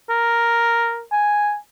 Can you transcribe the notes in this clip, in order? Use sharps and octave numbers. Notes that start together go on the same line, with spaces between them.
A#4
G#5